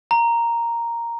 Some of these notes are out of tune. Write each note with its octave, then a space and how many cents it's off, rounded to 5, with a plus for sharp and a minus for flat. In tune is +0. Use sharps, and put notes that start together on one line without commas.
A#5 +0